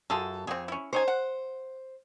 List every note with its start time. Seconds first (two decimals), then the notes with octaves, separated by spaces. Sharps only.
0.10 F#2 F4 G#4 A4
0.47 F2 C4 G#4
0.68 C#4 E4
0.93 C#4 D#4 C5 G#5
1.08 F#5